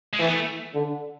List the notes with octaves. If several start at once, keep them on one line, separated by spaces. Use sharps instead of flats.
G#3
E3 A3
B3
A3
D3